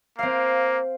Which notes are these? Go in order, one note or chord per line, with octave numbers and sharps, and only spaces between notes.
A#3 C4 F5